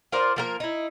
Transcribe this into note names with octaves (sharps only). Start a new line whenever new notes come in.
F4 A#4 C5 D5
F3 A#3 A#4
D#4 E4